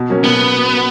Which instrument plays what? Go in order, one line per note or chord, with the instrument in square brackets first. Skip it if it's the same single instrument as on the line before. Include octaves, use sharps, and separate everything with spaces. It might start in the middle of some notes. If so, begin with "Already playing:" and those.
Already playing: [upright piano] B2
F#3 A#3 C#4
[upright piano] B2 [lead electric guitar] B3